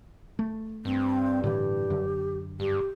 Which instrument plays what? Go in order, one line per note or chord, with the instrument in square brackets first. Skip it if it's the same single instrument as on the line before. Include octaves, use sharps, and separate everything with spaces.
[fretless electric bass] A3
[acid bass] G2 [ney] C4
[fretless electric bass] A2 D3 E3 [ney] G4
[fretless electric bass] F#2 D3
[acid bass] G2 [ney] G4